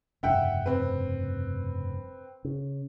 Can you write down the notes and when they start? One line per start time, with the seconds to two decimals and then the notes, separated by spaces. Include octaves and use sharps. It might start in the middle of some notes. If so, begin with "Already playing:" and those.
0.23 F1 G2 C#3 E5 F#5 G5
0.66 C4 B4
2.45 C#3